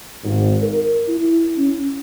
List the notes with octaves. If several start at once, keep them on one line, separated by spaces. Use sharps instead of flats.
G#1
A#4
E4
C#4